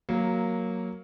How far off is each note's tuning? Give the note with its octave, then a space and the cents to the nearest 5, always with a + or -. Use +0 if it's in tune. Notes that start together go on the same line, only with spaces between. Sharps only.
F#3 +0 A#3 +0 A#4 -5